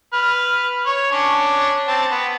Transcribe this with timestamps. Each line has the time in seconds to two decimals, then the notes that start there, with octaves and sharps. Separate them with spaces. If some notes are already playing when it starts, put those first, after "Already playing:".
0.13 B4 F6
0.86 C#5
1.12 C#4 D4
1.88 C4 A5
2.11 B3